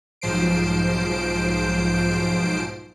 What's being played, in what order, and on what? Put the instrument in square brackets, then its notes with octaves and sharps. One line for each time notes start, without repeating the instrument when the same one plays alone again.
[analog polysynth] B1 G#2 F3 C5 C7 D7